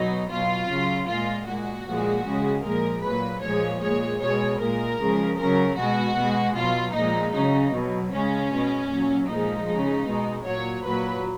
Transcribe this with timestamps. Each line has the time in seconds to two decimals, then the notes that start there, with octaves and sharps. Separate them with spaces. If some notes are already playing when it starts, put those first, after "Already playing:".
Already playing: B2 F#3 D#4
0.30 B2 F#3 F4
0.69 C#3 F#3
1.08 A#2 G#3 F4
1.47 A#2 G#3 F#4
1.86 A#2 F3 G#3
2.25 C#3 G#3
2.64 A#2 F3 G#3 A#4
3.03 A#2 F#3 B4
3.42 A#2 F3 G#3 C#5
3.81 A#2 G#3 C#5
4.20 B2 G#3 C#5
4.60 A#2 G#3 A#4
4.99 C#3 F3 G#3
5.38 C#3 F#3 A#4
5.76 B2 G#3 F#4
6.16 B2 G#3
6.55 B2 F#3 F4
6.94 A#2 F3 G#3 D#4
7.33 C#3 F#3 D#4
7.72 B2 F#3
8.11 C#3 G#3 C#4
8.51 B2 G#3
8.89 A#2 F#3
9.28 A#2 F3 G#3 D#4
9.68 C#3 G#3
10.06 B2 G#3
10.45 A#2 F#3 C#5
10.85 A#2 F#3 B4